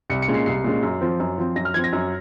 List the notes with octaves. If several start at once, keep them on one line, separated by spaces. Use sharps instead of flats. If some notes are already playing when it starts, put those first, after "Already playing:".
C2 C#7
C#7
A#2 G#3 C#4
C7
C2 C7
A#2 G#3 C#4
F#2
F3 C4
F#2
F3 C4
F#2 A#6
F6
F3 C4 G#6
A#6
F#2